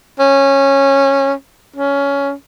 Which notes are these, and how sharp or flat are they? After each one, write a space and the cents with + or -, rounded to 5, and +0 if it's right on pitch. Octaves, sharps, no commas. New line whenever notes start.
C#4 -15
C#4 +15